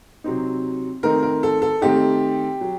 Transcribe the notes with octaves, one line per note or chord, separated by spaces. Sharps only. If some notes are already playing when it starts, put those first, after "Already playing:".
C3 F#3 C4 D#4
D#3 A3 C4 D#4 A#4
A#4
A4
A4
D#3 A3 C4 D#4 G4
F#3